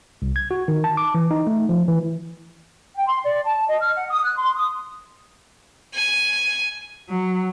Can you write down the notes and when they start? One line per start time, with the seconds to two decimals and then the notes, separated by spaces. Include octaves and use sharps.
0.22 C2
0.36 G#6
0.51 F#4
0.68 D#3
0.84 A5
0.97 D6
1.15 E3
1.31 D#4
1.47 A3
1.69 F3
1.88 E3
2.95 G5
3.07 C6
3.24 D5
3.44 A5
3.67 D#5
3.80 F6
3.95 F#5
4.09 D#6
4.24 F#6
4.36 C6
4.54 D#6
5.95 G#5
7.09 F#3